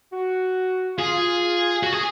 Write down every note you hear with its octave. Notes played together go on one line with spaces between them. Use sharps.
F#4
F4 G#4
F#4
G#4